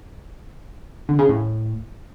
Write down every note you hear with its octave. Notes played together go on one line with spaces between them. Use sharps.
D3
C#3
A2